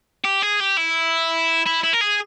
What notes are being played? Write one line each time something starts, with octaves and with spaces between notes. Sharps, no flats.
G4
G#4
G4
E4
E4
E4
A#4
G#4